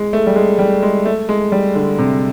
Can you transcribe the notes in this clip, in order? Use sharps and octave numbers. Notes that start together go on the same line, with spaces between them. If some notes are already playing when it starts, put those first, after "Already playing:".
Already playing: G#3
A3
G3
G#3
G3
G#3
A3
G#3
G3
D3
C3